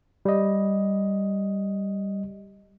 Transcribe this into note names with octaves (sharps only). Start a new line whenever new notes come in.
G3 D#5